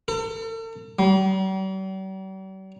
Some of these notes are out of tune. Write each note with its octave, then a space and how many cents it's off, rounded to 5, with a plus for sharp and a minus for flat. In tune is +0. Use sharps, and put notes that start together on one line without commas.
A4 +45
G3 -45